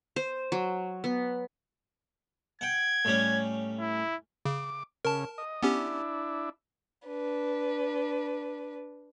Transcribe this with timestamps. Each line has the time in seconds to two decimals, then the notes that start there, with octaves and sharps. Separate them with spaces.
0.16 C5
0.52 F#3
1.04 B3
2.61 F#5 G5 G#6
3.05 A2 G3 C#4
3.80 E4
4.45 C#3 D6
5.05 C#3 A#4 A5
5.38 D#5
5.63 B3 C#4 D4 E4 G4
7.08 D4 B4